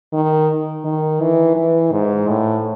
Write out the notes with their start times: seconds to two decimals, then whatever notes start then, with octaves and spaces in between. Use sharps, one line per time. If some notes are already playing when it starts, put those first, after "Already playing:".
0.13 D#3
0.85 D#3
1.21 E3
1.56 E3
1.93 G#2
2.29 A2